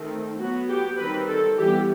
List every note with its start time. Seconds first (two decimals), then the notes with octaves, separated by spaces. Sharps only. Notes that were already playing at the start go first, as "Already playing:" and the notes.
Already playing: D#3 A3 C4
0.38 F#3 B3 F#4
0.68 G4
0.98 D#3 G3 C4 B4
1.28 A4
1.57 E3 G3 B3 G4